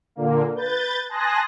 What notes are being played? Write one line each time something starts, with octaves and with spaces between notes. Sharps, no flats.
A#2 D3 A#3
B4 G6 A6
G#5 A5 C6 D#6 F#6 A#6